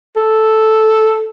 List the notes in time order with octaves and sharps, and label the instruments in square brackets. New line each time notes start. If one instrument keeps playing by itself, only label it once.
[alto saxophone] A4